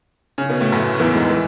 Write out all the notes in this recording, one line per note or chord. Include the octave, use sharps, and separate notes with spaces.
C#3 C#4
B2 B3
A2 A3
F#2 F#3
E2 E3
G#2 G#3
E3